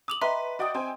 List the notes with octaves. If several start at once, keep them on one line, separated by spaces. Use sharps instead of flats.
D6 D#6 F7 F#7
B4 D#5 E5 G5 A#5 C6
F#4 D5 D#5 G5 D#6
C4 G5 G#5 C6